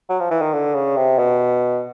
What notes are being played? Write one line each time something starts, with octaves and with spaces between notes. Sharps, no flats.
F#3
F3
E3
D#3
D3
C#3
C3
B2